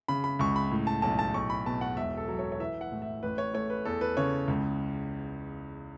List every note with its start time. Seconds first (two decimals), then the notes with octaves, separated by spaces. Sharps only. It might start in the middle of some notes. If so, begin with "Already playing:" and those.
0.08 C#3 B5
0.24 B5
0.39 C#2 C#6
0.56 B5
0.71 A2
0.87 A5
1.02 B1 A5
1.19 A5
1.34 B1 C#6
1.50 B5
1.66 B2 A5
1.81 F#5
1.97 E1 E5
2.17 A4
2.28 F#3
2.39 C#5
2.52 C#5
2.59 E3 E5
2.81 F#5
2.92 A2
3.02 E5
3.23 A1 B4
3.38 C#5
3.54 A3 C#5
3.70 B4
3.85 E2 A4
4.01 B4
4.17 C#3 C#5
4.48 C#2